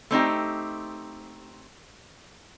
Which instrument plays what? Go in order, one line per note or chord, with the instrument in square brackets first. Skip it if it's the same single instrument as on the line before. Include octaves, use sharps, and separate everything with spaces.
[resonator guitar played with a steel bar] A3 C4 D#4 G4